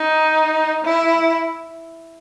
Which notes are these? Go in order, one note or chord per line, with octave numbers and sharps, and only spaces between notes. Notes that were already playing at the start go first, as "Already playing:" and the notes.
Already playing: D#4
E4